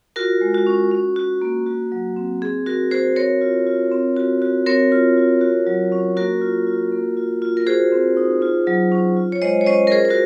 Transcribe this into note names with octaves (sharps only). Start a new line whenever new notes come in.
F4 F#4 A#4
G#3
F#4
C#4
C#4
F#4
A#3
F#4
F#3
C4
C4 G#4
F#4 A#4
F#4 G#4 C5
C4 A#4 C#5
F4
F4
C4
F#4
F#4
C4 A#4 C#5
F4
F4
F#4
F#3
C#4
A#3 F#4 A#4
F4
F4
A#3
F4
F4
A#4
F#4 G#4 C5
C4
D#4
F4
F#3
C#4
F4
C#5
G#3 C5 D#5
C#5
C#4 C5 D#5
A#4
F4 G#4 C5
C5
F#4 A#4